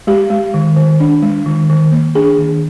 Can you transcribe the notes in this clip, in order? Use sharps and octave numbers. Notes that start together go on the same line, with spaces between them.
G#3 G4
G#3
D#3
D#3
D4
G#3
D#3
D#3
A#3
D4 G#4
D#3